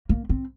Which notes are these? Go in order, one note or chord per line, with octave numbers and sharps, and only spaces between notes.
A#3
C4